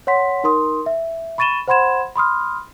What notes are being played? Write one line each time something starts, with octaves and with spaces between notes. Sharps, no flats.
C#5 F#5 C6 B6
D#4 A#4 C6 D#6
E5
B5 C#6 A6 D#7 E7 G7
C5 F#5 B5 C6 G#6 E7
B5 C6 D#6 F6